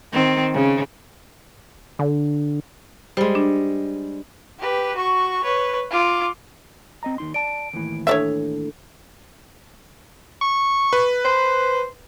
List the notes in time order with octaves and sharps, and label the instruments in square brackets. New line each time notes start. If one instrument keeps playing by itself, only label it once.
[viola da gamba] D#3 C4
C#3
[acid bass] D3
[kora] G3 G#3 [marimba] C5
[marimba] D4
[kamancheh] G4 B4
F#4 C#6
B4 C#5
F4 D6
[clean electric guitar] C4 D#5 A#5
D#2 D#4 C6
[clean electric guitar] D5 A5 [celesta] D7
[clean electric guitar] D#2 A2 E3
[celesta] D4 A4 [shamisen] C#5 D5 E5
[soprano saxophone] C#6
[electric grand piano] B4
[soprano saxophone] C5